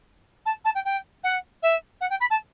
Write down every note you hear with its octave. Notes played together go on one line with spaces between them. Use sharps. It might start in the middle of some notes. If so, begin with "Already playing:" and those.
A5
A5
G5
G5
F#5
E5
F#5
G5
B5
A5